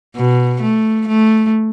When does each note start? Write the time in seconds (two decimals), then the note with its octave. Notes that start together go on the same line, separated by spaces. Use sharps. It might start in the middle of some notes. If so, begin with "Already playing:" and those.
0.16 B2
0.62 A3
1.08 A3